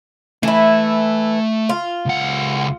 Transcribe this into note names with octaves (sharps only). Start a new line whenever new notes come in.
E3 A3 E4 A4
F4
C#2 F#5